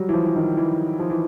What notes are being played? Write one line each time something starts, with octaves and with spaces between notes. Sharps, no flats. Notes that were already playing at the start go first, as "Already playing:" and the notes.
Already playing: F#3 G3
E3
F3
E3
D#3
E3
F3
E3